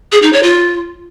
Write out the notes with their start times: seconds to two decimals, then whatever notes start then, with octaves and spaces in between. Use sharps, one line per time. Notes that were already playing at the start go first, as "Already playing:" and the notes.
0.12 G#4
0.22 D#4
0.33 C#5
0.43 F4